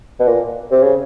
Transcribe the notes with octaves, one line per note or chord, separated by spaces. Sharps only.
B2
A#2
C3
C#3